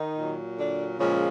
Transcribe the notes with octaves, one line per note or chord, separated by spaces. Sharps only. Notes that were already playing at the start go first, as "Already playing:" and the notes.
Already playing: D#3 D#4
A#2 F#3
D3 D4
A#2 C#3 F3 G#3 C#4